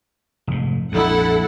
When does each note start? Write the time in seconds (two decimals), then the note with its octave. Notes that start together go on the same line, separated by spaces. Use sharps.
0.47 F1 G#2
0.92 A#1 F2 E4 A4 F#5